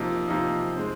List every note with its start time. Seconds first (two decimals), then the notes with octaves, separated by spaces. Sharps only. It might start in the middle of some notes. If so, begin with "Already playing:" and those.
Already playing: C3 F3 A#3 D#4
0.28 C3 F3 A#3 D#4
0.76 G#3 C4